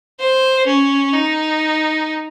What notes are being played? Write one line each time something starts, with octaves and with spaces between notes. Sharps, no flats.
C5
C#4
D#4